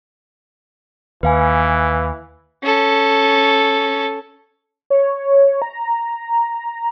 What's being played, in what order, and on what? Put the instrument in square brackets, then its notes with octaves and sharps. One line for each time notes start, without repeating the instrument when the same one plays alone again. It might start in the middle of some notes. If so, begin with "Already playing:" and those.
[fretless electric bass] D#2 [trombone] E3 [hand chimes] B4 F5 G#5
[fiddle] C#4 A4
[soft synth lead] C#5
A#5